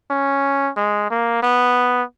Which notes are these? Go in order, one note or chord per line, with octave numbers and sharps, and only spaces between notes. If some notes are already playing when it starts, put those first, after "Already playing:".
C#4
G#3
A#3
B3